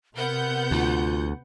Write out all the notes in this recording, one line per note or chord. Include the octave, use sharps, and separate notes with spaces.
C3 B3 A#4 F#5 G6
D2 F4